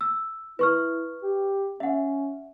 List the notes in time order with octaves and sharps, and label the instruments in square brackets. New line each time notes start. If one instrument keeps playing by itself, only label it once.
[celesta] E6
[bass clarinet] E4 [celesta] B4 C#6 F6
[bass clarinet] G4
[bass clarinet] C#4 [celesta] E5 F#5